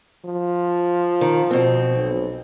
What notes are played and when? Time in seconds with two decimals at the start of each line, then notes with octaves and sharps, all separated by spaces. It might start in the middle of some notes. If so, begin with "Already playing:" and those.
0.25 F3
1.21 D#3
1.51 B2 C4
1.95 B1